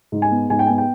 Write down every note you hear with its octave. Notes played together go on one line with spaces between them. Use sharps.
G#2
G#5
B3
G#2 G#5
G5
B3 G#5
G5